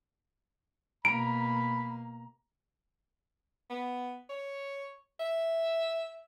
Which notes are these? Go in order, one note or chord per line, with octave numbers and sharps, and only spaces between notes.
B2 A#3 A#5 B5 D7
B3
C#5
E5